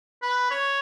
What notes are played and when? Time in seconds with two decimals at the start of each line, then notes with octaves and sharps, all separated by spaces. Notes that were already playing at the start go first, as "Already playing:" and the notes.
0.22 B4
0.51 C#5